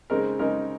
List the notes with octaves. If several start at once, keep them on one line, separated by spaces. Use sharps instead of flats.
C#3 G#3 C4 D#4 A#4
C#3 G#3 C4 D#4 A#4